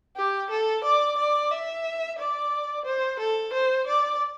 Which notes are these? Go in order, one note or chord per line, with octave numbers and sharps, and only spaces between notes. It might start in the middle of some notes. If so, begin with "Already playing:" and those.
G4
A4
D5
D5
E5
D5
C5
A4
C5
D5